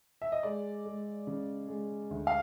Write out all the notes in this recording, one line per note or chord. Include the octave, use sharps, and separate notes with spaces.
E5
D#5
G#3 D5
G#3
C#3
G#3
D2
F5